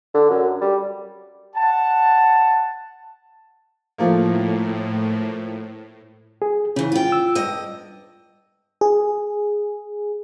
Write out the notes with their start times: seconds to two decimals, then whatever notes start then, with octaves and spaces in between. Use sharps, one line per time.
0.14 D3
0.30 F#2
0.61 G3
1.56 F#5 A5
3.98 A2 F3 A3 A#3
6.42 G#4
6.76 C#3 E3 C#4
6.92 F4 G5
7.12 E6
7.35 G2 D#5
8.81 G#4